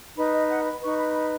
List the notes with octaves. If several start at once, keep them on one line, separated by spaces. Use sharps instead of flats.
D#4 B4 B5
D#5
F#5
B5
D#4 B4 C#6
B5
B5